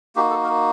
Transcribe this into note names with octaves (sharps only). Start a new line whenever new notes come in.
A#3 D#4 F#4 G4
A4
A#4